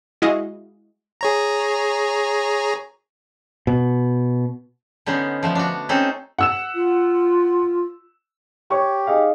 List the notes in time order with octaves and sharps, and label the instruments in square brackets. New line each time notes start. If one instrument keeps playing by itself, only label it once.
[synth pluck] G#3 E4 F#4 G#4 D#5 F5
[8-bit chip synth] G#4 C#5 A#5
[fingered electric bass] B2
[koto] D3 B3 C#4 D#4 C5
F3 A3 B3
D4 F#4
C4 C#4 D#4 A4 C5
[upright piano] F#5 E6 E7
[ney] F4
[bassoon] G4 [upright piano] C#5 C#6
[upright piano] D#4 G#4 F5